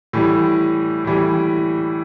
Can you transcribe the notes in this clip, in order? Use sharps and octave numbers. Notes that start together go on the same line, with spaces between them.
A2 E3 G3
A2 E3 G3